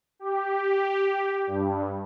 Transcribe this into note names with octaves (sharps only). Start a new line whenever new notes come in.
G4
G2